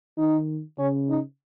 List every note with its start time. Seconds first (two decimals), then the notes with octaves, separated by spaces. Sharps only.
0.18 D#3 D#4
0.79 C#3 C#4
1.09 D#4